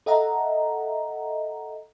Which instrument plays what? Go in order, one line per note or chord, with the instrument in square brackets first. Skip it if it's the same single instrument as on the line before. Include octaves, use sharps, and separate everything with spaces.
[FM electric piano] A4 D#5 E5 F#5 A#5